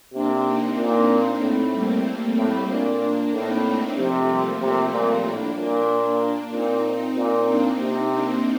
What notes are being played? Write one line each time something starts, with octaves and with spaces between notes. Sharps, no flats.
C3 A#3 D4
C4 D#4
A#2 C4 D#4
A#3 D4
A2 A3 C4
G3 A#3
G3 A#3
A2 A3 C4
A#2 A#3 D4
A#3 D4
A2 C4 D#4
A3 C4
C3 F3 A3
G3 A#3
C3 A3 C4
A#2
A2 A#3 D4
A#2
A#2 C4 D#4
A#2
A#3 D4
C3 C4 D#4
A#3 D4